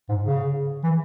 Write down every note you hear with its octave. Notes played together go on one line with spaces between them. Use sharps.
G#2
C#3
E3